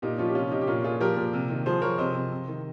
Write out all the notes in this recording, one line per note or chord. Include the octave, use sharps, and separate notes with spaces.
A#2 D#4 G4
F3 C#4 F4
G4
C3 C#4 F4
C3 D#4 G4
G4
A#2 C#4 F4
A#2 F4 G#4
F3 G4 A#4
A#2
C3
D#3
F3 G#4 C5
F3 A#4 C#5
C3 C5 D#5
C3
C3
D#3